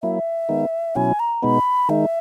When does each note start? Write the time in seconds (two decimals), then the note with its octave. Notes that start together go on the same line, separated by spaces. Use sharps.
0.03 F#3 A#3 E4 E5
0.49 D#3 G#3 B3 D#4
0.95 B2 F#3 C#4 E4 G#5
1.20 A#5
1.42 B2 G#3 B3 D#4 B5
1.89 D#3 G#3 D#4 E5